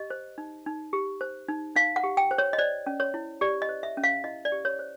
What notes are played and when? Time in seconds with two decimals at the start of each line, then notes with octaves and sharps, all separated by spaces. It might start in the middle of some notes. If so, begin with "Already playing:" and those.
Already playing: G4 D#5
0.10 C5
0.38 D#4
0.66 D#4
0.93 G4
1.21 C5
1.49 D#4
1.76 D#4 F5
1.96 F#5
2.04 G4
2.17 G5
2.31 C5
2.38 C#5
2.53 D#5
2.58 C5 D5
2.86 C#4
3.00 C#5
3.14 E4
3.41 G4 D5
3.62 D#5
3.69 C5
3.83 E5
3.97 C#4
4.04 F5
4.24 E4 D#5
4.45 D5
4.52 G4
4.65 C#5
4.79 C5